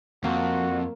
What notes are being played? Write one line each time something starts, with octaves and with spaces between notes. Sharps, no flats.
F2 A#3 F#4